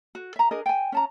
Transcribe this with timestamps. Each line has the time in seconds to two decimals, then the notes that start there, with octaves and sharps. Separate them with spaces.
0.15 F#4
0.36 E5 A#5
0.51 D4 G#4 A#4 D#5
0.66 G5 G#5
0.92 C#4 A5 A#5